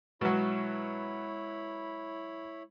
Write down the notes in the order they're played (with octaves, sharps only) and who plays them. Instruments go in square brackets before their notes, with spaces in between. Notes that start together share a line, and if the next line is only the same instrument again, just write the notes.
[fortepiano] B2 F#3 [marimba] G#3 [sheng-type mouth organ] E4 C#5 B5